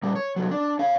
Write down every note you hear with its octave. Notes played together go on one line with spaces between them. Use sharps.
A#2 G3
C#5
C2 F#3
D4
C#5 F5